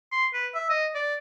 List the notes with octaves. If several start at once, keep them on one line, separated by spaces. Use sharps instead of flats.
C6
B4
E5
D#5
D5